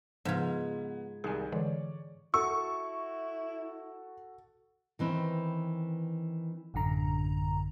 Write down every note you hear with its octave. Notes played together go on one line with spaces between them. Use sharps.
G#2 C#3 F3 B3 F4 G#6
C2 D#3 G3 G#4 G#5
D3 E3 G#3 C#5 D5
E4 F#4 A4 C#6 E6
D#3 E3 C4
A1 F#2 D3 A#5